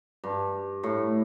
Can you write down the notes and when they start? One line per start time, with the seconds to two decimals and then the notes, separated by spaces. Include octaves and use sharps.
0.24 G2
0.83 A2